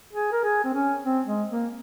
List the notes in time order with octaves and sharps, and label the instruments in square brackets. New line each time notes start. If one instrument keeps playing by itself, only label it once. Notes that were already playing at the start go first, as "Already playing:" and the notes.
[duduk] G#4
A#4
G#4
C4
C#4
C4
G#3
A#3